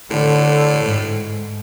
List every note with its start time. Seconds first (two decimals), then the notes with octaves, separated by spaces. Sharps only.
0.11 A2 D3
0.84 G#2